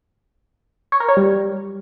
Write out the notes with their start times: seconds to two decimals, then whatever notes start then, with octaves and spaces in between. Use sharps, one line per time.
0.92 C#5
1.00 A#4
1.09 C#5
1.17 G3